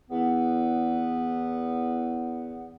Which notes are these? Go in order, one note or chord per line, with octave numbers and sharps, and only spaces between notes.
E2 B3